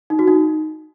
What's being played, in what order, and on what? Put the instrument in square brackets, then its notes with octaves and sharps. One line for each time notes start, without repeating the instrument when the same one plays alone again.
[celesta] D#4
F#4
D#4